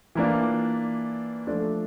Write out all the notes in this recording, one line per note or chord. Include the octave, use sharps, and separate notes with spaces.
E3 A#3 D4 F4
F3 A3 D4